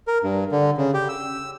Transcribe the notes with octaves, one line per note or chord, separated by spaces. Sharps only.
A#4
G2
D3
C#3
G4
E6